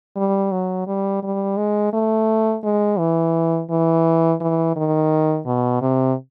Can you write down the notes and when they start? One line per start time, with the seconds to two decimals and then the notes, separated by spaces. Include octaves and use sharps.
0.16 G3
0.52 F#3
0.87 G3
1.23 G3
1.57 G#3
1.93 A3
2.64 G#3
2.99 E3
3.70 E3
4.41 E3
4.76 D#3
5.46 B2
5.81 C3